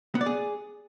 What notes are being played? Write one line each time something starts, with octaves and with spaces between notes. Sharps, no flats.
B3
D5
G#4